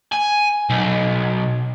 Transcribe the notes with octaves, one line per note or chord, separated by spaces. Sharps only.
G#5
B1